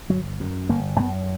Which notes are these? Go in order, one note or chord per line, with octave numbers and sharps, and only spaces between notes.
G1 F#3
F#2
G1 A#3
F#2 B3